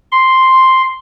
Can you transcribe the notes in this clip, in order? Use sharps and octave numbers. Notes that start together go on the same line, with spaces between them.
C6